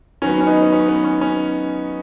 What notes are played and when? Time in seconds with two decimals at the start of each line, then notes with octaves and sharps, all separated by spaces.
0.22 D#3 F#3 B3 C#4
0.40 C#4
0.47 B3 D#4
0.62 B3
0.72 C#4
0.88 B3
1.05 C#4
1.21 C#4